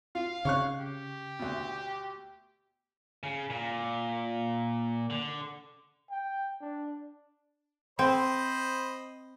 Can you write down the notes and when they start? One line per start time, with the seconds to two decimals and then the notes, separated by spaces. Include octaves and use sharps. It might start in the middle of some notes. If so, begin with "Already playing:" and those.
0.15 F4 F5
0.45 C#3 C#5 C#6 F#6
0.80 G4
1.39 D2 B2
3.23 C#3
3.50 A#2
5.10 D3
6.11 G5
6.61 D4
7.99 C4 C5 D#5 B5